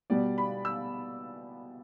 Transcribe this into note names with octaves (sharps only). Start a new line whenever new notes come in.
B2 G3 B3 D5
B5
E6